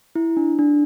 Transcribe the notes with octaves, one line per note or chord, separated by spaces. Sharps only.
E4
D4
D4